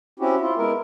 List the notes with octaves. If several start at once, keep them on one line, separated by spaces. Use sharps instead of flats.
C4 C#4 E4 F#4 G4
E4 F4
G#3 B3 E4 A#4